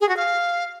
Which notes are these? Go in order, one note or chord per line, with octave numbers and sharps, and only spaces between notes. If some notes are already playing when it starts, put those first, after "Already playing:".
G#4
F#4
F5